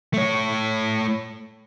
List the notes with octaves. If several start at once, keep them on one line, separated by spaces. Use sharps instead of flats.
A3 C#5